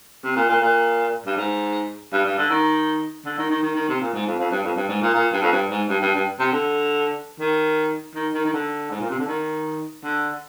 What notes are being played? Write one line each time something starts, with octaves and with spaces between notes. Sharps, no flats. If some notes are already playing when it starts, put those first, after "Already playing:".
C3
A#2
A#2
A#2
G2
G#2
G2
G2
D3
D#3
D3
D#3
D#3
D#3
D#3
C3
A#2
G#2
F2
F2
G2
F2
G2
G#2
A#2
A#2
G2
F2
G2
G#2
G2
G2
G2
C3
D3
D#3
D#3
D#3
D#3
D3
G#2
A#2
C3
D3
D#3
D3